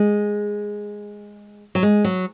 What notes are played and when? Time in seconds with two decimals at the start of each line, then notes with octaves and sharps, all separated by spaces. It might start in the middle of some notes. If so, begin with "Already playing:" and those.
Already playing: G#3
1.75 F#3
1.83 G#3
2.04 F#3